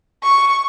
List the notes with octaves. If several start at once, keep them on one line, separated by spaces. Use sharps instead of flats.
C#6